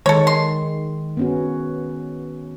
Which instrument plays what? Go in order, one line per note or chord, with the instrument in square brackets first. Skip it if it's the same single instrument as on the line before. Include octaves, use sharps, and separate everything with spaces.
[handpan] D#3 G#3 [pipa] A4 C#5
[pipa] C6
[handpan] B3 C#4 F#4